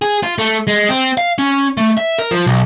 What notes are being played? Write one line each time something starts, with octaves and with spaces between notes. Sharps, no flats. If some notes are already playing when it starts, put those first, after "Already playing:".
G#4
F4
A3
G#3
C4
F5
C#4
A3
E5
A#4
F3
B1